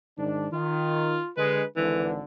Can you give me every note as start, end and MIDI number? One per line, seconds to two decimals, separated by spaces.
0.18 0.47 44
0.18 0.47 51
0.18 0.47 62
0.52 1.18 51
0.52 1.30 65
1.37 1.62 50
1.37 1.62 56
1.37 1.65 71
1.76 2.22 32
1.76 2.22 50
1.76 2.13 52